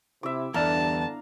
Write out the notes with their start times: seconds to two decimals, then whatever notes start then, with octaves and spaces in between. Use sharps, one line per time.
0.23 C3 E4 E5 D6
0.54 E2 G2 D3 D4 F5 A5 A#5